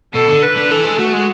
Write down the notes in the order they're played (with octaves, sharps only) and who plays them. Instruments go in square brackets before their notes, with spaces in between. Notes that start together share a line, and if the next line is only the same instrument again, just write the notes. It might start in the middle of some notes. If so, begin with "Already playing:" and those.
[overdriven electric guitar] B2 [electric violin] A4
[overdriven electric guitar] D3
[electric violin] B4
[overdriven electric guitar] D3
[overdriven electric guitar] E3 [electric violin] A4
[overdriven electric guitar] G#3
[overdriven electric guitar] A3 [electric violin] F#4
[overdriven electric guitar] G#3